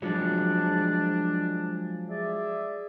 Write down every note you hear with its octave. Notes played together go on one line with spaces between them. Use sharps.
F3 F#3 G#3 D4
G#4 D5 E5